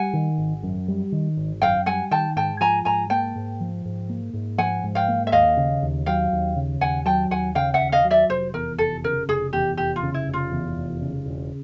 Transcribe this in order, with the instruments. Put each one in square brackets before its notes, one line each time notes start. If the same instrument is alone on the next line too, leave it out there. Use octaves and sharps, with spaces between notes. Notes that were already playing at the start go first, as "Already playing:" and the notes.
Already playing: [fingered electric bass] G3 [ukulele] F#5 G#5
[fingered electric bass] D#3
G#1
F#2
G3
D#3
G#1
[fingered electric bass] F#2 [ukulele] F5 G5
[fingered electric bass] G3 [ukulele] F#5 G#5
[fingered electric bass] D#3 [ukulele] G5 A5
[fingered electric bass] G#2 [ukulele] G5 A5
[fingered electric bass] F3 [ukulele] G#5 A#5
[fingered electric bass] G#2 [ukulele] G#5 A#5
[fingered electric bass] A#3 [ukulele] G5 A5
[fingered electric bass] G#2
F3
G#2
A#3
G#2
[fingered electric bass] F3 [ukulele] F#5 G#5
[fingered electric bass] G#2
[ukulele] F5 G5
[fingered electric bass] A#3
[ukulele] E5
[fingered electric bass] D#2 [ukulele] D#5 F5
[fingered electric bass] C#3
D#2
[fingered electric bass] F#3 [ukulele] F5 G5
[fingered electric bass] D#2
C#3
[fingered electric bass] D#2 [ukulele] F#5 G#5
[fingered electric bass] F#3 [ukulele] G5 A5
[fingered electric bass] D#2 [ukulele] F#5 G#5
[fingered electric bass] C#3 [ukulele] F5 G5
[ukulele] E5 F#5
[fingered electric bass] D#2
[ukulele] D#5 F5
[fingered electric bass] F#3
[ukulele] D5 E5
[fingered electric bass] F1 [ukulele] C5
[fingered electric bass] E2 [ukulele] A#4
[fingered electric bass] F1 [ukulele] A4
[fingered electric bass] C#3 [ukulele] A#4
[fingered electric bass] F1 [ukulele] G#4
[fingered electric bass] E2 [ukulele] G4
[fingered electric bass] F1 [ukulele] G4
[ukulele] F4
[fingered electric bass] C#3
[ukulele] E4
[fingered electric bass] F1
[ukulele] F4
[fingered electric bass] E2
F1
C#3
E1